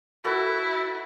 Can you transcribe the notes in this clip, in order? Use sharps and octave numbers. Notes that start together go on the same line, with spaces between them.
E4 F#4 A4 B4